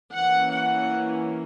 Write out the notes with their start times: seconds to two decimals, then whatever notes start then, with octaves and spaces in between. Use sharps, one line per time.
0.14 E3 A#3 C#4 F#5
0.53 F#5